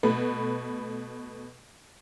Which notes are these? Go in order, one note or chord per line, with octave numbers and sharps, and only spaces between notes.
B2 A3 B4